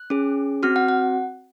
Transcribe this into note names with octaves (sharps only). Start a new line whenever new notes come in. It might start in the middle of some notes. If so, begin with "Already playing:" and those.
Already playing: F#6
C#4 G#4
C4 F#4 F6
F#5
F#5